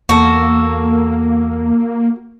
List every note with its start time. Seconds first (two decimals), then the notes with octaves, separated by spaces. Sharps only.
0.09 E2 A#3 F#4 A4